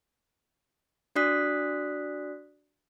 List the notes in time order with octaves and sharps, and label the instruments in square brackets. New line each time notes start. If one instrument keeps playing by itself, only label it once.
[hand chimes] D4 F#4 D5 D#6 F#6 B6